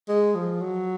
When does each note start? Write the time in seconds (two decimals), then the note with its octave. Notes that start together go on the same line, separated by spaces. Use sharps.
0.09 G#3
0.35 F3
0.61 F#3